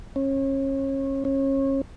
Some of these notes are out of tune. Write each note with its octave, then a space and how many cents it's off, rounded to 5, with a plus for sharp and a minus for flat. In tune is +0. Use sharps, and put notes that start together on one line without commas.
C#4 -30
C#4 -30